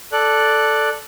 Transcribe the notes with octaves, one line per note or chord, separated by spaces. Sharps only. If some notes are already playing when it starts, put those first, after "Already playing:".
A4 D5 F#6